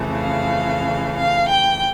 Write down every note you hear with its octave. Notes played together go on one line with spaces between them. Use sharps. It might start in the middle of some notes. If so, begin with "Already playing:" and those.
Already playing: F2 C#3 E3 A3
F5
F5
G5